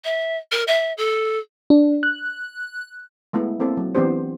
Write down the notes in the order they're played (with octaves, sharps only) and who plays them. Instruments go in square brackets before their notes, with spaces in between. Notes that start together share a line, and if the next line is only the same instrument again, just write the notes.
[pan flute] E5
A#4
E5
A4
[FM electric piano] D4
F#6
[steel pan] G#3 A3 B3 E4
A#3 C4 E4 A4
F#3
E3 B3 C4 D4 G4 C5